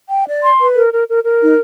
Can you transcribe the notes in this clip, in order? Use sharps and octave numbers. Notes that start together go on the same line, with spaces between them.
G5
D5
C6
B4
A#4
A#4
A#4
A#4
D#4